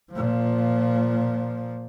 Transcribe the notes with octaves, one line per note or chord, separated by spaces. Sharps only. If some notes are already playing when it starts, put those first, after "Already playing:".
A#2 F3